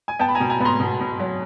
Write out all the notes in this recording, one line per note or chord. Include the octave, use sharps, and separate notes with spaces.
G#5
B3 G5 A5
B5
G#5 A#5
B2
G#5 A#5
B3 A#5 B5 C6
B2
B2
F#3